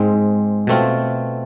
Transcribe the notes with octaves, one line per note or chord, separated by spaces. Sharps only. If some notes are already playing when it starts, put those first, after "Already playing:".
Already playing: G#2 G#3 C4
B2 A3 C4 F4